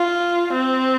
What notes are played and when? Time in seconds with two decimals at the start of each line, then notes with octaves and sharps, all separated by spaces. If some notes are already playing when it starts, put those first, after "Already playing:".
Already playing: F4
0.53 C4